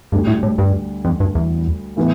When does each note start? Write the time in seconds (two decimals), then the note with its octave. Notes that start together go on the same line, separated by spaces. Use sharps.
0.12 D2 G2 D3 G3
0.27 A2
0.43 A2
0.58 G2
1.05 F2
1.20 G2
1.35 E2
1.96 A2 E3 B3